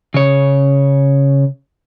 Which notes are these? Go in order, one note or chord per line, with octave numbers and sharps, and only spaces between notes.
C#3 C#5